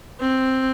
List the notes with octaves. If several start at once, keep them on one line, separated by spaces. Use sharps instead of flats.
C4